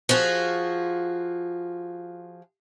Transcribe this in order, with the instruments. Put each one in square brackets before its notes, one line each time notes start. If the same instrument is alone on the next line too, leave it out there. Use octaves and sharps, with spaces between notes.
[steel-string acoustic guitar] F3 F4 F#4 G#4